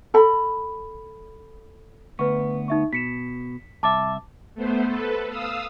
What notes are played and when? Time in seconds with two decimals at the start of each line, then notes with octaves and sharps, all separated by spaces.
0.14 A4 B5
2.19 D2 B3 B4 C#6
2.68 D#4 E5 C#6
2.93 B2 B6 C#7 E7
3.83 C2 E5 A5 D6 A6
4.55 A3 B3 C5
4.87 A4 B4
5.29 F5 D#6 E6